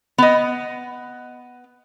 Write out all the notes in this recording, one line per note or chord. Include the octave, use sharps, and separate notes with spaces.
B3 D#5